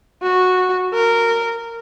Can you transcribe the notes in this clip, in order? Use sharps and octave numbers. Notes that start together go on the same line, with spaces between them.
F#4
A#4